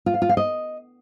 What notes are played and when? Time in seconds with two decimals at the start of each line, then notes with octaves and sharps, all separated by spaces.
0.06 F4
0.14 F5
0.22 F4
0.29 F5
0.37 D#5